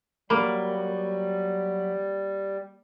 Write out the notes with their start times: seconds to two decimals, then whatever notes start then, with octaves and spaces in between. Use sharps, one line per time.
0.30 F#3 G3 A#3 B5